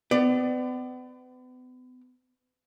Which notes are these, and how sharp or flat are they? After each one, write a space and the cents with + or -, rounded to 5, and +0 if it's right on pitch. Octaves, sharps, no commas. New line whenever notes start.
B3 +40 D5 +25